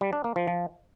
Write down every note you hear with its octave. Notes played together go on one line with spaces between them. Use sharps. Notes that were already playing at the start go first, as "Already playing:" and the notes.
G3
D4
A#3
F3
F3